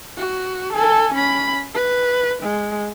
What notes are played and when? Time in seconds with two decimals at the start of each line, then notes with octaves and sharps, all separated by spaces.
0.18 F#4
0.73 A4 G#5
1.14 C#4 B5
1.74 B4
2.43 G#3